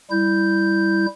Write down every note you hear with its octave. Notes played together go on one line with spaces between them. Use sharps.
G3 E4 G6